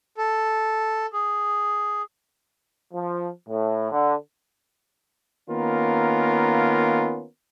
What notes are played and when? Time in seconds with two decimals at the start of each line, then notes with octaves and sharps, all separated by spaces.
0.17 A4
1.13 G#4
2.93 F3
3.48 A2
3.92 D3
5.50 D#3 A#3 B3 C#4 F4 A#4